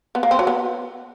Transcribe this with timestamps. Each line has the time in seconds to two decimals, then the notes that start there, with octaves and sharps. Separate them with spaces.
0.15 B3
0.23 A#3
0.31 C4
0.39 F#3
0.47 B3